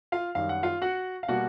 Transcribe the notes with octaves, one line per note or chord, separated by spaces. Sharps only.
F4 F5
F#2 D#3 G3 F5
F#5
F4 F5
F#4 F#5
F5
B2 G3 A#3 F#4 F#5